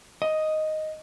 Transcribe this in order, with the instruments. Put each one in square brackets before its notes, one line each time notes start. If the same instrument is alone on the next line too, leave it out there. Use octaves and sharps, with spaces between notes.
[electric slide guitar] D#5